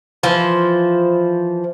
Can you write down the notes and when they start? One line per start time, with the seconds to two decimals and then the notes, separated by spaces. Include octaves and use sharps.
0.23 E3 F3 C5